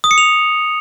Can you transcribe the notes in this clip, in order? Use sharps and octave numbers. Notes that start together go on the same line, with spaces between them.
D#6
C#7
F7